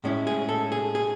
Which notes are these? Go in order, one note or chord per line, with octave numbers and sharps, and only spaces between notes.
A2 G#3 C#4 E4
G#4
A4
G#4
G#4